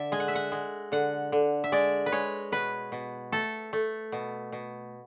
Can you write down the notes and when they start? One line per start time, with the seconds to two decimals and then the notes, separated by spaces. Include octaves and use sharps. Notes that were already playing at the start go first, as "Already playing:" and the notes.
Already playing: D3 D5 E5
0.12 G#3 G#5
0.20 F#5
0.28 E5
0.35 F#5
0.52 G#3
0.92 D3 F#5
1.32 D3
1.64 E5
1.72 G#3 D5
2.06 B4
2.12 G#3 C#5
2.52 B2 B4
2.92 B2
3.32 A3 A4
3.73 A3
4.12 B2
4.52 B2